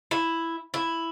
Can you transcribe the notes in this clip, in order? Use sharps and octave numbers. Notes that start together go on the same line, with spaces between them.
E4
E4